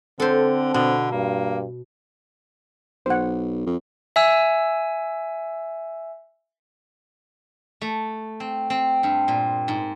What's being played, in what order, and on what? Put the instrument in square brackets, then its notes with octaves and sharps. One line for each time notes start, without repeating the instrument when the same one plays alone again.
[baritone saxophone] D3 [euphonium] C4 [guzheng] A4 C5
[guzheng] B2 [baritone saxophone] D3
[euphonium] G2 [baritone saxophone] A#3
[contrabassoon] B1 [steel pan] C5 F#5
[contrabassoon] F2
[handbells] E5 G#5 E6
[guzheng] A3
C4
C4
G2
A#2
G#2